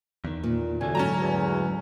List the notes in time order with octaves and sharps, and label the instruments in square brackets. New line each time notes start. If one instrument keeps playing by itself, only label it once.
[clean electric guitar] E2 D#3
[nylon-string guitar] A#2
[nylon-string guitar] D2 [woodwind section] A2 G#5 [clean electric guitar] C3 A3
[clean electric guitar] G#2 F#3 [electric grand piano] C#4 A5 A#5
[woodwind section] E2